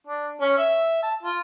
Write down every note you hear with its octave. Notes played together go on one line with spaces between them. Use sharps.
D4
C#4
E5
A5
F4